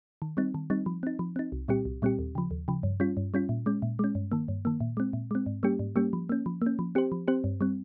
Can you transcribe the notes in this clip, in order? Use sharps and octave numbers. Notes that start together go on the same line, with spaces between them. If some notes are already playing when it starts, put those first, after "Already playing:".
D#3
G3 C4 D#4
D#3
G3 C4 D#4
F3
C4 D#4
F3
C4 D#4
C2
A#2 G3 C4 G4
C2
A#2 G3 C4 G4
D#2
C#3 F3
D#2
C#3 F3
G2
G3 C#4 F4
G2
G3 C#4 F4
A#2
G#3 C#4
A#2
G#3 C#4
G2
D#3 A#3
G2
D#3 A#3
A#2
G#3 C4
A#2
G#3 C4
G#2
G3 A#3 C#4 G4
G#2
G3 A#3 C#4 G4
F3
A#3 C#4
F3
A#3 C#4
F3
C4 G4 C5
F3
C4 G4 C5
G2
G3 C4